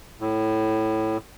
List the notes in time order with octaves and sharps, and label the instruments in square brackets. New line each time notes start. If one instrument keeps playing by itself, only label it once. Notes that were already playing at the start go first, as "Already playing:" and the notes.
[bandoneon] A2